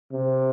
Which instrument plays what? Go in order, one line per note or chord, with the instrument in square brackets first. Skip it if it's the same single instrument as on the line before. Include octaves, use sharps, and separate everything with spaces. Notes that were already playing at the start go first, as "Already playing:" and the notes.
[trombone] C3